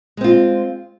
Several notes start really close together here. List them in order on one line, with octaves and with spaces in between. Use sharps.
G#3 C4 F4